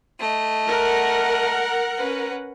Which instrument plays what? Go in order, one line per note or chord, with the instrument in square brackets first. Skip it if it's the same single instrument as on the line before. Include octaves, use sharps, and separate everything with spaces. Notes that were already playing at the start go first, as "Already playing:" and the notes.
[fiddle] A3 D#5
[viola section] A#4 F#5
[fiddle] C#4 B4